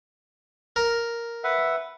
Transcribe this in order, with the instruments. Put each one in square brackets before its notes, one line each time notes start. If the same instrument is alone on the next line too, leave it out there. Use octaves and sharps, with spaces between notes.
[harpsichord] A#4
[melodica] B4 E5 F#5